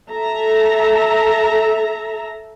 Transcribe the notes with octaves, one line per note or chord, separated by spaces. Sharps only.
A4 E5 A#5